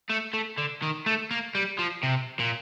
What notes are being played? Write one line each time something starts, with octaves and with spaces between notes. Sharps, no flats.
A3
A3
D3
D#3
A3
A#3
G3
F3
C3
A#2